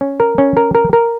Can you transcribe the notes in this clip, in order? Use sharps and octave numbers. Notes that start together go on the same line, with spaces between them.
C#4
A#4
C#4
A#4
A#4
A#4